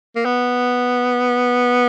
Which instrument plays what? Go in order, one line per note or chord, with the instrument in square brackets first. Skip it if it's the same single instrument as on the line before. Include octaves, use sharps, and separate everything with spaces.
[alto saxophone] A#3
B3